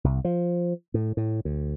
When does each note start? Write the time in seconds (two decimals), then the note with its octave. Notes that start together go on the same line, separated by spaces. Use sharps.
0.04 C2
0.25 F3
0.94 A2
1.17 A2
1.45 D2